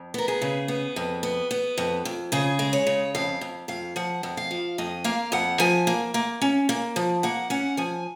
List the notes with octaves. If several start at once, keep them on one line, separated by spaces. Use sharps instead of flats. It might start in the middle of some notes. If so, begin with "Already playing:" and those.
Already playing: F2
B3 A#4
G#4
C#3
B3
F2
B3
B3
F2
F2
C#3 G#4
G#3
C#5
C#3
F2 F5
F2
F2 F5
F3 F#5
F2
F5
F3
F2 D#5
A#3 F5
F2 F#5
F3 G#5
A#3
A#3
C#4
A#3
F3
A#3 F#5
C#4 F#5
F3 G#5